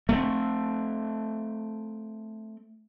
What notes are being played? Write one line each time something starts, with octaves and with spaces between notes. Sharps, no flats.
A3 C4